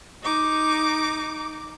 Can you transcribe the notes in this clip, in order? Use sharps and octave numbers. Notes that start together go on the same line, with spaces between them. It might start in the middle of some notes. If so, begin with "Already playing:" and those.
D#4 D6